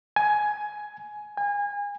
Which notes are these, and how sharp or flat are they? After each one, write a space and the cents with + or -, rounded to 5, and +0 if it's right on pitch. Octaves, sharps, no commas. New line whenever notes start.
G#5 +15
G#5 -30